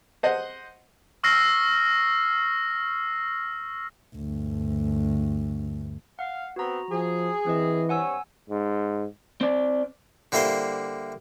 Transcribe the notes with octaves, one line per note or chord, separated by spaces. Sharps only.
C5 D#5 F#5
C#6 E6 F6 A#6 C7
D2 G2
F5 F#5
B3 C4 F#4 A#5
F3 G#4
E3 C4 D#5
G2 C4 C#5 F#5 G#5 E6
G#2
C4 D5
D3 G3 A#3 E4 C5 C6